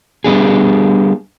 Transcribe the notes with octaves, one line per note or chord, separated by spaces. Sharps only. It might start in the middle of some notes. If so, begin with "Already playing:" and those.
G3 B3 D4 G#4